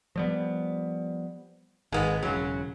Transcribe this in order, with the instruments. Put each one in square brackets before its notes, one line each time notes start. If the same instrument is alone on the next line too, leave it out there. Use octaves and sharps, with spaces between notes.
[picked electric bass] F3 G3 B3
[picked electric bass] G#1 [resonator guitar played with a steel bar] G#3 A#3 B3
[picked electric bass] E1 C#3 [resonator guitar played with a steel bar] F#3